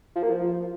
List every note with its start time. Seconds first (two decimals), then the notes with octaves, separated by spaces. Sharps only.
0.15 F3
0.23 A#3
0.30 F3